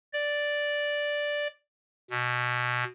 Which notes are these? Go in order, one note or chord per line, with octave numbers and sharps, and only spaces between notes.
D5
B2